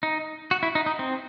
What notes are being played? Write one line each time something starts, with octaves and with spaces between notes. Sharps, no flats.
D#4
F#4
E4
D#4
D#4
C4